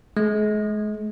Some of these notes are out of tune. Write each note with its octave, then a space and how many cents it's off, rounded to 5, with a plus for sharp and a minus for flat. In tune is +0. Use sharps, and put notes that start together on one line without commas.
G#3 +35